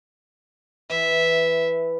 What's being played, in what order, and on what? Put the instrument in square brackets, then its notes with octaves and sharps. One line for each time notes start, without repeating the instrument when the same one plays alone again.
[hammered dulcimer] E3 [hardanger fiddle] E5